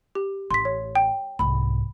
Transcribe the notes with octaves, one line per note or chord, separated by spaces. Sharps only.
G4
A1 C6 B6
C#5
G5
C2 G#2 B5